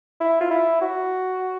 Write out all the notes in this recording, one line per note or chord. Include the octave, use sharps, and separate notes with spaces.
E4
F4
E4
F#4